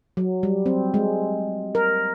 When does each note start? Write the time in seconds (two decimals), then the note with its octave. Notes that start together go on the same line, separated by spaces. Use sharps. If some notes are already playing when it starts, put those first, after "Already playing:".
0.17 F#3
0.43 G3
0.66 C4
0.94 G#3
1.75 A#4